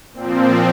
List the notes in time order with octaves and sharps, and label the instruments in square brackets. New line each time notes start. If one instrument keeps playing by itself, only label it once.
[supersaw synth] A#2 F3 C4